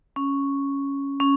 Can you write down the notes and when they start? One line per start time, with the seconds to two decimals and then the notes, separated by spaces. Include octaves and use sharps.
0.16 C#4
1.20 C#4